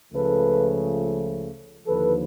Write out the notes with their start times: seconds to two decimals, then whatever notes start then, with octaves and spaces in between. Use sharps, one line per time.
0.12 C#2 C#3 F3 A3 A4 B4
1.86 D#2 D3 F3 A4 B4